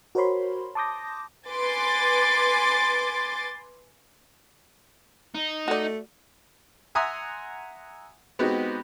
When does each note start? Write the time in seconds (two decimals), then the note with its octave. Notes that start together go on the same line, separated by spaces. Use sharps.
0.15 F#4 A#4 C5 C#5 B5 C6
0.75 A5 C6 D6 D#6 G6 A#6
1.48 B4 G#5 C6 D6 A6
5.35 D#4
5.68 A3 F#4 D5
6.95 E5 F#5 G#5 A#5 C6 D#6
8.39 G#3 B3 C4 D#4 F#4 G4